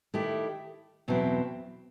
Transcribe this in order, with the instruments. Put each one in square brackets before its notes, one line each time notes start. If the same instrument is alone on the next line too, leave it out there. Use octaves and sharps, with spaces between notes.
[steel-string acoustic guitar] D#3 A3 E4 G4
E2 B2 F#3 C4 E4